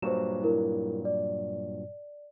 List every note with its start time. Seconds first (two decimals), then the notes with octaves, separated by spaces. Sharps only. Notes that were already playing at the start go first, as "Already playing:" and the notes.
0.02 G2 A#2 F#3 C5 C#6 E7
0.42 E4 A#4
1.05 D5